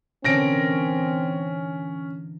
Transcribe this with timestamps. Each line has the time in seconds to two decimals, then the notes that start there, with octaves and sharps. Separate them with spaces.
0.24 A#2 D3 E3 C4 C#4 A#6 D7